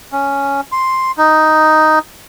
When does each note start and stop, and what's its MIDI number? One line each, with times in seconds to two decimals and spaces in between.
0.12 0.61 61
0.72 1.12 84
1.18 1.99 63